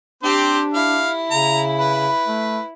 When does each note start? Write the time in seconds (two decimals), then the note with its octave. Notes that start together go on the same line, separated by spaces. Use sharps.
0.23 C4 D4 G4 C5
0.74 E4 F5
1.31 C#3 A#5
1.79 B4
2.27 A3